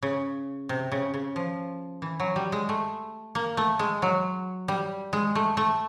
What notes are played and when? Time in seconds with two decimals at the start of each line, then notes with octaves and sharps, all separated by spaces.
0.03 C#3
0.69 C3
0.92 C#3
1.14 C#3
1.36 F3
2.02 E3
2.20 F#3
2.36 G3
2.52 G#3
2.69 A3
3.35 A#3
3.57 A3
3.79 G#3
4.02 F#3
4.68 G3
5.13 G#3
5.35 A3
5.57 A3